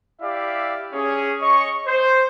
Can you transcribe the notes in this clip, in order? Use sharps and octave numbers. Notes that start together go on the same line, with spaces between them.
E4 G4 D5 E5 F5
C#4 G#4
C#5 D#5 C#6
C5